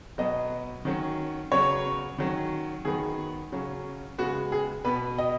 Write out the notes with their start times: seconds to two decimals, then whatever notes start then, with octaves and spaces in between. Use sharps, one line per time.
0.18 B2 F#3 B3 D#5
0.85 D#3 F#3 C#4
1.52 C#3 F#3 B3 C#5
2.18 D#3 F#3 C#4
2.85 D#3 F#3 B3 G#4
3.52 C#3 F#3 C#4
4.18 C#3 G#3 B3 F#4
4.52 G#4
4.85 B2 B3 B4
5.18 D#5